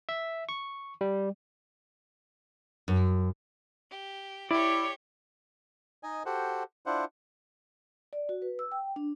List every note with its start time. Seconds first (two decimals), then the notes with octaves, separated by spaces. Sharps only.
0.09 E5
0.49 C#6
1.01 G3
2.88 F#2
3.91 G4
4.51 E4 G4 C#5 D5
6.03 D#4 D#5 G#5
6.26 F#4 G4 A4 C5 F#5
6.86 D4 E4 F4 C5 F#5
8.13 D5
8.29 F#4
8.42 B4
8.59 E6
8.72 G5
8.96 D4